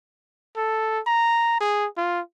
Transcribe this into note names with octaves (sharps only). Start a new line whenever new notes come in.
A4
A#5
G#4
F4